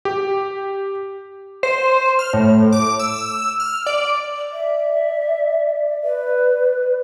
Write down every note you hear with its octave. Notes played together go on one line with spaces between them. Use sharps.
G4
C5
F6
A2
D6
E6
F6
D5
D5 E5
B4
D5